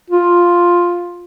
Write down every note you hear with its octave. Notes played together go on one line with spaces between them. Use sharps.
F4